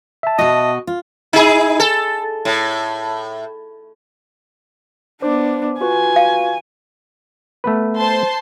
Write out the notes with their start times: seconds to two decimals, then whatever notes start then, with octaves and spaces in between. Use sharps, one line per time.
0.23 E5 A5
0.39 B2 F#4 D#5
0.87 F4
1.33 D#4 E4 G#4
1.80 A4
2.45 A2
5.22 B3 D4 C5 D6
5.81 F4 F#4 B4 G#5
6.16 F5
7.64 A3 B3 B4
7.98 C5 A5 C6